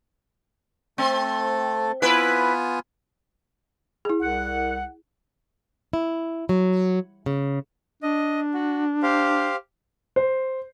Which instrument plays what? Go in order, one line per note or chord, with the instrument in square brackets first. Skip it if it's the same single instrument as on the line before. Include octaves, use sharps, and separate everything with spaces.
[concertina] A3 A4 [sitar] C4
[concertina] B3 F4 G#5 [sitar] E4 B4
[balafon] E4 G#4
[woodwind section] C2 F#5
[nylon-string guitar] E4
F#3
C#3
[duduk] D4 [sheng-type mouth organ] D#5
[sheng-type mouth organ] F#4
G4 C5 F5
[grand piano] C5